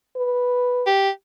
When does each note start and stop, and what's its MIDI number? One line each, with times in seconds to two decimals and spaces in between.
0.16 0.86 71
0.87 1.10 67